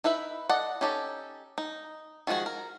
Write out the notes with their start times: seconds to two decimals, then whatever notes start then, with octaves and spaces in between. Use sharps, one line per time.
0.04 D#4 E4 B4 E5
0.49 A4 D5 D#5 F#5
0.81 C#4 D#4 G4 A4
1.58 D#4
2.27 D#3 F3 G#3 F#4 G#4
2.46 A#4